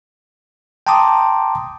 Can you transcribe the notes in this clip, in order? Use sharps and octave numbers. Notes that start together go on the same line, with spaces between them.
G5 A5 A#5 C6 D6 D#6